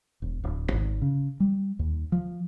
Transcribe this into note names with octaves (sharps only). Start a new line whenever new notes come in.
E1
D1
G#1
C#3
G3
D#2
F3